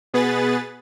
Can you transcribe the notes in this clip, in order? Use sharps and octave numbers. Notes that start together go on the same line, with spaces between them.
B2 B3 G#4 B4 A6